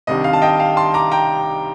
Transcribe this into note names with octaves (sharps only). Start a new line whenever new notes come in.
C2 C3 D#3 G3 D4 D#5
F5
A5
D#5 G5
F5 A5
A5 C6
A#5 D6
G5 A#5